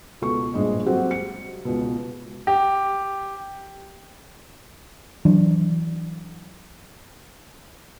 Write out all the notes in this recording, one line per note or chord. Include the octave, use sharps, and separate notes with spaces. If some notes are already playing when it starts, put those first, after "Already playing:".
C#2 B2 A4 C#6
A#1 G2 G#3 D4 D#5
F#3 C4 F#4 G4 A4 C5
C#7
C#2 B2
G4
E3 F#3 D4